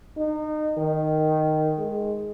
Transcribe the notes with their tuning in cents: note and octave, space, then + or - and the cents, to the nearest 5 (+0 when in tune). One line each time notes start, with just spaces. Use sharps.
D#4 -30
D#3 -5
G#3 +5